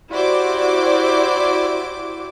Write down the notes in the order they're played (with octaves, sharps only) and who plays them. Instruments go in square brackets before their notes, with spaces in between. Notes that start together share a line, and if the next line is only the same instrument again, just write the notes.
[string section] E4 F#4 G4 C5 D5 D6